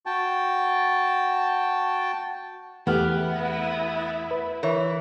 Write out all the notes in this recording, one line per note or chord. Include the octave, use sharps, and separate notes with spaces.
F#4 G5 A5
E2 A3 B3 G4 F6
E4
B4
E3 A#4 C#5 E5